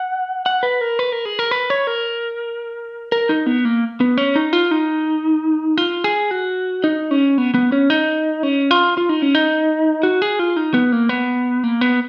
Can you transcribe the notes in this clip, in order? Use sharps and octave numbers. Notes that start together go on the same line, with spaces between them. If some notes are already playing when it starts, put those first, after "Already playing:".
Already playing: F#5
F#5
B4
A#4
B4
A#4
G#4
A#4
B4
C#5
A#4
A#4
D#4
B3
A#3
B3
C#4
D#4
F4
D#4
F4
G#4
F#4
D#4
C#4
B3
B3
C#4
D#4
C#4
F4
F4
D#4
C#4
D#4
F#4
G#4
F4
D#4
B3
A#3
B3
A#3
B3